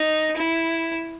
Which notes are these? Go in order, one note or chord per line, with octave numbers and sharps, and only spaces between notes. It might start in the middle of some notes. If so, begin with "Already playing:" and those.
Already playing: D#4
E4